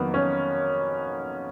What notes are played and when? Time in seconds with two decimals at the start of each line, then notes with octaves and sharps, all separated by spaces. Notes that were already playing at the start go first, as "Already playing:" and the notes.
Already playing: F2 D#3 F#3 A#3 B3
0.14 C#4